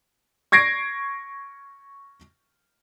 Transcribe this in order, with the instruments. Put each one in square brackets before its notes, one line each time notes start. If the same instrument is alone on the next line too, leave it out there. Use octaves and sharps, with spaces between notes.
[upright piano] C#6 G#6 A#6 C7 D7